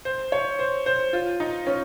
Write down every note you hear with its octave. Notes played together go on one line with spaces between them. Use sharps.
C5
C#5
C5
C5
F4
D#4
C#4